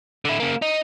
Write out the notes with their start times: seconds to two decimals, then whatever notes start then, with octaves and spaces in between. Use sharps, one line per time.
0.25 D3 E4
0.40 C#3 A#3
0.62 D#4